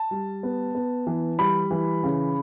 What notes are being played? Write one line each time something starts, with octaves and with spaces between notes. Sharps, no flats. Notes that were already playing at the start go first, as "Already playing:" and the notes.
Already playing: A5
G3
B3
B3
E3
G3 B5
E3
C#3